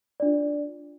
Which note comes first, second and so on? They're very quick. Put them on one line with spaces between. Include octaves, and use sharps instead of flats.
D5 D4 F4